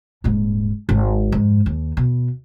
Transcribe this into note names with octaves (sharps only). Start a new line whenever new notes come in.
D#1 G#2
G#1
F2 G#2
D#2
B2